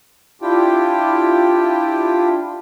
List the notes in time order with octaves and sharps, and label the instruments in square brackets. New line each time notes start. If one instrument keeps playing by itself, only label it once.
[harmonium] D4 E4 F4 G4 G5